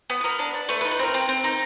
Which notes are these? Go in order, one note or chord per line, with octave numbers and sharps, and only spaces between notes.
B3
B4
B3 A#4
D4
D4
A3 B4
B4
D#4
B4
C4 A#4
C4
C4
D#4